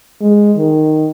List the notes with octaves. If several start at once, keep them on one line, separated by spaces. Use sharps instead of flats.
G#3
D#3